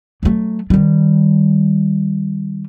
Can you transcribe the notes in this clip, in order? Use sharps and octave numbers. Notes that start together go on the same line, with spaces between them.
F#3 A3
D#3 G3